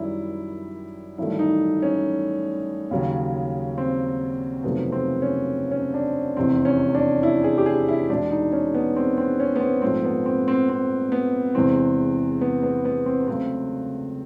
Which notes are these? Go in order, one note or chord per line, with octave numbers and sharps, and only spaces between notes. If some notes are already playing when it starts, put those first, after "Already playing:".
Already playing: F#2 D#3 G3 E4
A1 G2 D#3 F#3 A3 E4
D#4
C#4
D#2 C#3 F#3
C4
F2 C3 D#3 F#3 A3 B3
C4
C#4
C#4
D4
F1 E2 C3 E3 C4
C#4
D4
E4
G#4
G4
G#4
E4
E2 B2 G#3 D4
D#4
C#4
B3
C4
C4
C#4
B3
C4
A#1 G#2 F3 A3 C4
B3
C4
C4
C4
B3
E2 C3 E3 G#3 C4
B3
B3
B3
C4
C#2 C#3 F#3 A3 C4